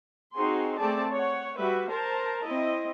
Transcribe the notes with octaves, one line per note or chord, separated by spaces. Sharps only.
C4 D#4 F#4 G#4 C6
A3 C4 G#4 D5 A5
C#5 F#5
G3 F#4 B4 E5
A#4 C5 A5 A#5
C4 E4 D#5